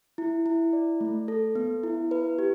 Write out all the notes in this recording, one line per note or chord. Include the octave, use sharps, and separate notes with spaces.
E4
E4
D5
A3
A4
B3
E4
B4
G4